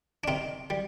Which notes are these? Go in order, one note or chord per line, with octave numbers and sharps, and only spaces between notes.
D4
C3 C4 D#4
G3